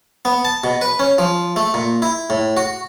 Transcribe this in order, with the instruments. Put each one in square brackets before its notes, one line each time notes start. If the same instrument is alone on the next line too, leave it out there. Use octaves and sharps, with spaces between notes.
[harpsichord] B3
A5
B2
B4
C#4
F3
A3
A#2
E4
A2
F#4